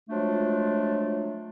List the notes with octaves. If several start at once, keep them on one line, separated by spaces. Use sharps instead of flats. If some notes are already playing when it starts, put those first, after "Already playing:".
F3 F#3 G#3 A3 D4 F4